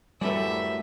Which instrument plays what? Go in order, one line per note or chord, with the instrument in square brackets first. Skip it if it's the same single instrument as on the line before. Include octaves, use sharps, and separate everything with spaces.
[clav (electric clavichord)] F#2 A2 [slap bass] G3 A3 [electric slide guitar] B4 D5 [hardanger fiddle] E5